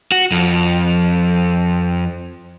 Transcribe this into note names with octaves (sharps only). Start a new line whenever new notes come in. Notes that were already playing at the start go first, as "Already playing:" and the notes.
F#4
F2